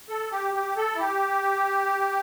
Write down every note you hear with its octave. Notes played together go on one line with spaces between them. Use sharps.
A4
G4
G4
A4
E4
G4